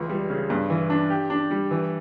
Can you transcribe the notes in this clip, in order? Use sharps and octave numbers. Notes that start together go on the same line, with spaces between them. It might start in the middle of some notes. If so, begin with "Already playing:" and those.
Already playing: C#2 E3
G3
C#3
G2
E3
D4
G4
D4
G3
E3